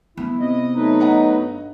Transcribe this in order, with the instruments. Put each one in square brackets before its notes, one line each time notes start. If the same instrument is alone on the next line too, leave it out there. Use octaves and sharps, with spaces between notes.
[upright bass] B3 [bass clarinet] E4
[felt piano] C3 [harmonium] D#5
[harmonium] F#3 A3 B4 [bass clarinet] D#4
[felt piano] D#5 F#5 A#5
[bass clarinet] G2